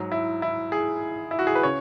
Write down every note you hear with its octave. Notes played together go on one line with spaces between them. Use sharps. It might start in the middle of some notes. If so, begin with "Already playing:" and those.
Already playing: G#2 F#3
E4
E4
G#4
E4
F#4
G#4
B4
C#3 C#5